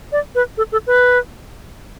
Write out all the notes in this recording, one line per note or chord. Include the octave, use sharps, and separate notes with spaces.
D5
B4
A4
A4
B4